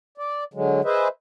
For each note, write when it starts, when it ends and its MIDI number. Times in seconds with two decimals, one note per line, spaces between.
0.18 0.44 74
0.54 0.81 50
0.54 0.81 54
0.54 0.81 56
0.84 1.08 68
0.84 1.08 71
0.84 1.08 72
0.84 1.08 75
0.84 1.08 76